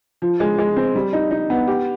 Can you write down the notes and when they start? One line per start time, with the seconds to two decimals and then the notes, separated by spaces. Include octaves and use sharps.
0.22 F3
0.40 G#3
0.58 G#3
0.76 C4
0.95 G3
1.13 D#4
1.31 D#4
1.50 B3
1.68 G4